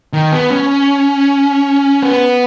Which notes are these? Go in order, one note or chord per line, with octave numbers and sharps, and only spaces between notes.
D#3
B3
C#4
B3